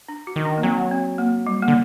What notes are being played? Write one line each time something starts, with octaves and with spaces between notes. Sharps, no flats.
D4
F#4
D#3
D4
A#3
F#3 C4
C4
A#3
G3
A#3
D3